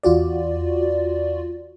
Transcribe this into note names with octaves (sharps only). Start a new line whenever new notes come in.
E2 F4 F#4 D5